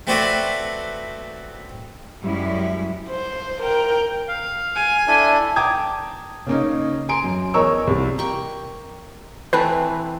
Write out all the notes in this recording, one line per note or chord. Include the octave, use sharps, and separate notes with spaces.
A3 C4 F#4 B4 D5 F#5
F#2 G3 G#3 E4
C5
A#4 G5
F5
G#5
D4 E4 A4
G5 A5 A#5 D6 D#6 G#6
C#3 A#3 C#4 D#4
G#5 A#5 C6 D7
F#2
E2 A#4 C#5 D#5 C#6 E6
C2 G3
A#3 G5 C#6
E3 A3 C4 B4